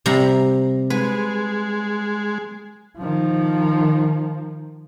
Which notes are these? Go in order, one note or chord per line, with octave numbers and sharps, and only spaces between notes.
C3 G3 A#5
G#3 B4
D#3 F3